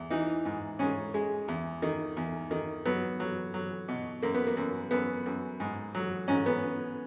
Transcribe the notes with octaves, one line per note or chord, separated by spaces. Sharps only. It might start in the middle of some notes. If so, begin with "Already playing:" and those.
Already playing: E2
E3 D#4
G#2
G#2 C#4
G#3
E2
D#3
E2
D#3
F#3 B3
F#3
F#3
B2
F#2 A#3
B3
A#3
F#2
F#2 B3
F#2
G#2
F#3
G#2 C#4
B3